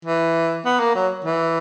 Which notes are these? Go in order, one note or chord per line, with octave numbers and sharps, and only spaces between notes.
E3
B3
A#3
F#3
E3